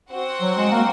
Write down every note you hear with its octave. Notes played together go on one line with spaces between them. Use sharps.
C4 F#4 C5 F#5
F#3
G#3
A#3